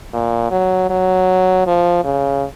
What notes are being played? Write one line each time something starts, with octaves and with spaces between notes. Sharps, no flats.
A#2
F#3
F#3
F3
C#3